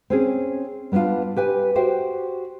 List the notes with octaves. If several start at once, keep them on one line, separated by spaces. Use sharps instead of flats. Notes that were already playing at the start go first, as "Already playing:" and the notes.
C4 C#4 G#4
G3 B3 C#4 D4 F4
G4 B4 G#5
F#4 G4 C5 E5 G5